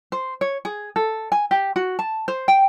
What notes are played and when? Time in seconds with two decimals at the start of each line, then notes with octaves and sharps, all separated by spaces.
0.12 C5
0.41 C#5
0.65 G#4
0.96 A4
1.32 G#5
1.51 G4
1.76 F#4
1.99 A5
2.28 C5
2.48 G5